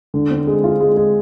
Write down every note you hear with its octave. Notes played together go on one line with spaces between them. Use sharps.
D3
C4
G#3
F4
G#3
G#3